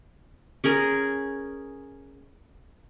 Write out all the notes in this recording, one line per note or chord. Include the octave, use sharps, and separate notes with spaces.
C#4 G#4 A#4